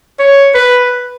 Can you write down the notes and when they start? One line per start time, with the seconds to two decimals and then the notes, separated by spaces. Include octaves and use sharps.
0.19 C#5
0.55 B4